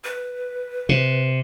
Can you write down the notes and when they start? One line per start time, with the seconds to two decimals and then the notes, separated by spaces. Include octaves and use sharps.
0.04 B4
0.89 C3